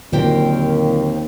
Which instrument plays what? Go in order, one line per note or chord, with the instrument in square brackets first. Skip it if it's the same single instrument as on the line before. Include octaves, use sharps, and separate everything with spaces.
[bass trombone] D#2 [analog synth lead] A#2 [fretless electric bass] D3 F#3 [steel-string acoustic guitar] C4 G4 A#4